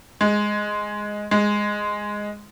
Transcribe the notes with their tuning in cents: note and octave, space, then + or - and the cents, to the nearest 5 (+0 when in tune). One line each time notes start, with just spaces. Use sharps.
G#3 +0
G#3 -5